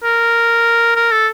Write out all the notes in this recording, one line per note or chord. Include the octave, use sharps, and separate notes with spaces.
A#4
A#4
A4